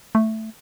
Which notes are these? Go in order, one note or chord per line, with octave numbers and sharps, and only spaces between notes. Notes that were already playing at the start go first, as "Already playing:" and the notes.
A3